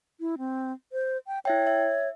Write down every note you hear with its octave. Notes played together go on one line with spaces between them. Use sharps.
E4
C4
C5
G5
E4 C#5 E5 G5
E5